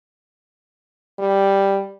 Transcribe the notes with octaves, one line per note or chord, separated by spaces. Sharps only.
G3